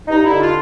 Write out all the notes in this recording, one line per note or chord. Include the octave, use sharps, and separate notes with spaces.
G2 D#4
D3 E4
F4